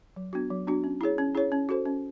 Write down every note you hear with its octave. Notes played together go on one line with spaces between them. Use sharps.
F#3
B3 D4 F#4
F#3
B3 D4 F#4
C#4
E4 G#4 C#5
C#4
E4 G#4 C#5
C#4
F#4 A4 C5
C#4